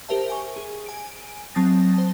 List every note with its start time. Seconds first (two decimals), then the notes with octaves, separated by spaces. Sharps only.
0.08 G4 A#4 C5 E5 A5
0.29 G#5 C#6
0.56 G#4
0.86 G#5 D7
1.55 F#3 C4 A5 D#6 A6 A#6
1.94 C5 A5